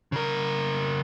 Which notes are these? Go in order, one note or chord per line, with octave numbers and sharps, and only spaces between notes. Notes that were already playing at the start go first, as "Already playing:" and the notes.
C#3 A#4